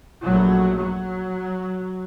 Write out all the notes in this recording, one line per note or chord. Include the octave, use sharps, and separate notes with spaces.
A#1 F#3 A3
F#3